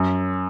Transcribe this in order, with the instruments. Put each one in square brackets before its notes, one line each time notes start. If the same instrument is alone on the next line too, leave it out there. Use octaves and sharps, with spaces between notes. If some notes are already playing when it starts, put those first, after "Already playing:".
Already playing: [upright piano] F#2